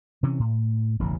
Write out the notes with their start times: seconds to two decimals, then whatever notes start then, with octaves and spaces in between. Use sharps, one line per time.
0.23 C3 E3 C#4
0.39 A2
1.00 E1 A1 G2 C#3